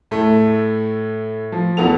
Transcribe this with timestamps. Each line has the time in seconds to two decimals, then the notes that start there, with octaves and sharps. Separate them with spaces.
0.11 A2 A3
1.52 F3
1.77 A1 E2 B3 F#4 A4 F7